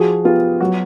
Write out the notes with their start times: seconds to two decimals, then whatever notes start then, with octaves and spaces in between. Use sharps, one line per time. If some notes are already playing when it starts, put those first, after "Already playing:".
Already playing: F3 F#4 G#4
0.24 B3 F4 G4
0.61 F#3 F#4